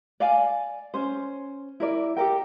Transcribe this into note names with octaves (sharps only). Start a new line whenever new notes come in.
D5 F5 G#5
C#4 C5
E4 A#4 D5
G4 A4 A#4 G5